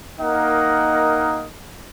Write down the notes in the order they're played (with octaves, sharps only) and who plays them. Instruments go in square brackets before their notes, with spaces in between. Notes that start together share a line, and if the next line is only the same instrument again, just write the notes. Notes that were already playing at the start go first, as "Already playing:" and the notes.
[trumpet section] A#3 D#4 A#4 D#5 F#5